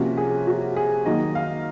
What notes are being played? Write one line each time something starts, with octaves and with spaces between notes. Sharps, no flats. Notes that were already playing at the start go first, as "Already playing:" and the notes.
Already playing: C3 F3 A#3 C#4 F#4
G#4
F#4
G#4
D#3 F#3 A#3 D#4 D#5
F5